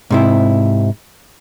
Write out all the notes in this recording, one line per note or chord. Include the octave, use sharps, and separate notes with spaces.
G#2 C3 E4